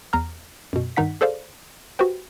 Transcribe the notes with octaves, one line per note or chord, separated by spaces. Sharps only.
E2 A#5 F6
F#2 B2
G2 D#3 D#4 F#5 B6
G#4 A4 C5 D5 F5
F#4 G4 B4 C5 G5